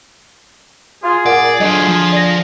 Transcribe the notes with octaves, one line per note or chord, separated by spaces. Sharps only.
F4 G#4
A#2 D5 F#5
D3 F#3 F4 D#5
F3
D5 A#6